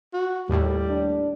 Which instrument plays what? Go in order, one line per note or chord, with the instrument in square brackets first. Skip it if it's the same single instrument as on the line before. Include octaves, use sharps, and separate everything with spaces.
[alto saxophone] F#4
[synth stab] D#2 A2 [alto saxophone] G3
[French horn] D4